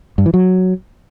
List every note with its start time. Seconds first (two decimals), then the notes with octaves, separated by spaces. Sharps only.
0.18 G2
0.26 E3
0.34 F#3